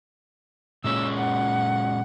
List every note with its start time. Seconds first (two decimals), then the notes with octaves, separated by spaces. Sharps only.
0.84 A#2 G#3 C#4 E6
1.17 F#5